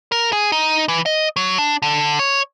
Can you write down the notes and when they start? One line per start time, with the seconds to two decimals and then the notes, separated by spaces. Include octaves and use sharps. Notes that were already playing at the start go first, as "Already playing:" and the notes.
0.12 A#4
0.33 G#4
0.52 D#4
0.88 E3
1.06 D#5
1.36 F#3
1.58 D4
1.82 D3
2.19 C#5